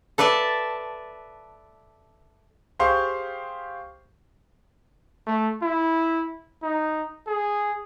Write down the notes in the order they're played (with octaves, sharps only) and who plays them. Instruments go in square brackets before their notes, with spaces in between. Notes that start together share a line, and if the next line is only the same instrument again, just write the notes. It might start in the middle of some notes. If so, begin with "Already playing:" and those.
[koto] A4 B4 D5 E5 A5
[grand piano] G4 G#4 C5 F5 C6 C#6
[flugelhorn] A3
E4
D#4
G#4